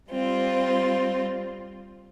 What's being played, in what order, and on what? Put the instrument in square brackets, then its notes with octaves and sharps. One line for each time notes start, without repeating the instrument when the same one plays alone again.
[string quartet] G3 C4 F4